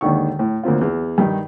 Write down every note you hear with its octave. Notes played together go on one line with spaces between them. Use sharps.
D#2 G#2 D3 D#3 C#6
A2
D2 A#3 C4 F4
E2
G2 D#3 D#4